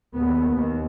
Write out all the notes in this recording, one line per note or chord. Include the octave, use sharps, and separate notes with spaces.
D#2 B3
D#2